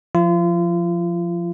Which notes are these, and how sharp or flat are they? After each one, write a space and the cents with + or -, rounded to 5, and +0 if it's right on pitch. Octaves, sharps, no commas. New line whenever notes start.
F3 +0 F4 -35